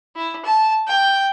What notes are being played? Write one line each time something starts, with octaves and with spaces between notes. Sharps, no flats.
E4
A5
G5